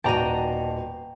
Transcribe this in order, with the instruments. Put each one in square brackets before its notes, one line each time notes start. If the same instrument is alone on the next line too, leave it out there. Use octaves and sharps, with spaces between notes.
[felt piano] D#1 D#7 [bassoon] B2 [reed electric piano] F#4 D5 A5 [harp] G5 A#5